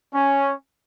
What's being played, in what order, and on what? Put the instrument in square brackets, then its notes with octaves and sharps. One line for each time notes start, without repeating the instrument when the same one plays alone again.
[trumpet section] C#4